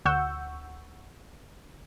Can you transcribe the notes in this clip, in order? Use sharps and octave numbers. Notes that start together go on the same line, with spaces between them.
D2 F#5 C#6 E6 G6